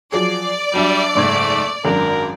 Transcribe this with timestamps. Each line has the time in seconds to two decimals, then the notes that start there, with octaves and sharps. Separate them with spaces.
0.12 F3 F#3 G#4 D5
0.74 F#3 G3 D4 E5
1.15 F#1 G#2 A3 G#6
1.85 G#1 F#2 D4 A#4